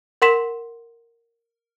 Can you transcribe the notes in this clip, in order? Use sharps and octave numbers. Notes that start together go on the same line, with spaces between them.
A#4 F#5 C6 B6 E7